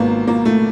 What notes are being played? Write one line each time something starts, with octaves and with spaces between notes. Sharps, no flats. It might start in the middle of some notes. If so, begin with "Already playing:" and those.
Already playing: G#1 G#2 A#3 B3
A#3
A3